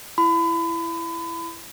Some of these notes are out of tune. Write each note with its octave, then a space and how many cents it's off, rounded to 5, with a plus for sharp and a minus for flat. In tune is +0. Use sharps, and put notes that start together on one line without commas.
E4 +20 B5 +35